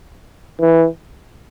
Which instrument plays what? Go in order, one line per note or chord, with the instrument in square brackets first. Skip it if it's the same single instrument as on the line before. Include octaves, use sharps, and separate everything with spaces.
[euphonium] E3